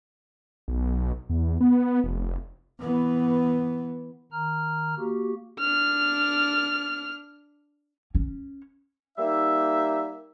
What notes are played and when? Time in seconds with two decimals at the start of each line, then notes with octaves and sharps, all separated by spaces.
0.68 B1
1.29 E2
1.61 B3
2.04 F1
2.80 E3 B3
4.32 D#3 A#5 F6
4.98 A#3 F#4 G4
5.60 D4 F6
8.15 C#4
9.18 G3 A#3 D#4 E5